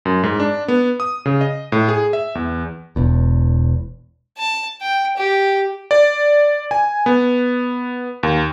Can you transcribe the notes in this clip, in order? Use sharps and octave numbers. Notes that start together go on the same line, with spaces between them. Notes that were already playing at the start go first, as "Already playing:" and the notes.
F#2
G#2
D4
B3
D#6
C#3
D#5
A2
G#4
E5
E2
E1 E2
A5
G5
G4
D5
G#5
B3
D#2